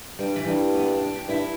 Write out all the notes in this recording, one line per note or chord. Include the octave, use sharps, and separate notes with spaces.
G2 G3
E3
G2 G3
B3
D4
D4
G4
G2 E4